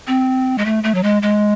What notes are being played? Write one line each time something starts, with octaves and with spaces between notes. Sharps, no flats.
C4
G#3
A3
A3
F#3
G#3
G#3